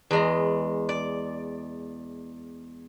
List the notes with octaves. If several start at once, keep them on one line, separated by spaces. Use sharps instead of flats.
E2 G#3 A#5
D5